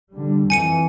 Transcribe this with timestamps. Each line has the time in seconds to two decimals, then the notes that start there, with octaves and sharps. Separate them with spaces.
0.11 D3 G3
0.50 F2 E3 G#5 C#7 D#7